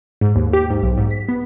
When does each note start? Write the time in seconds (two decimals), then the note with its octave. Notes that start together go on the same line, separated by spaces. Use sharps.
0.21 G#2
0.36 D#2
0.53 G4
0.70 G#2
0.83 B1
0.98 G#2
1.11 B6
1.29 B3